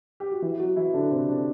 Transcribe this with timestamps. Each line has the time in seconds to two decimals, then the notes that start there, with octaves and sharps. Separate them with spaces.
0.20 G4
0.31 F#4
0.42 E3 E4
0.59 F#3 F#4
0.76 E3 E4
0.94 D3 D4
1.11 C3 C4
1.28 D3 D4